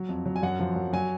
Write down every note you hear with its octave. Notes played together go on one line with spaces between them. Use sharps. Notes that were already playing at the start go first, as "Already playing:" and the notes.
Already playing: F#3
F2
F#3
G#5
F#2 F#5
F3
F#2
F#3 G#5